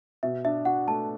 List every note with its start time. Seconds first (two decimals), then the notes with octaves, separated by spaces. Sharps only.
0.23 B2 E5
0.44 D4 E5
0.65 F#4 F#5
0.87 A3 A5